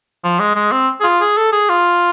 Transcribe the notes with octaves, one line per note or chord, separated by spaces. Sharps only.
F3
G#3
G#3
C4
G#4
F4
G#4
A4
G#4
F4